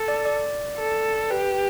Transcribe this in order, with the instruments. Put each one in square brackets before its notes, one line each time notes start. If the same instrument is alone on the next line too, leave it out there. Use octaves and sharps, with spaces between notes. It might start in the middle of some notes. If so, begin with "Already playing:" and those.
Already playing: [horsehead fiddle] A4
[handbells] D5
D5
[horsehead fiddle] A4
[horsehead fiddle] G4 [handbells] B4